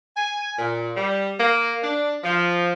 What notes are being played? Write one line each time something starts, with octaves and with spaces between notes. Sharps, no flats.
G#5
A#2
G3
A#3
D4
F3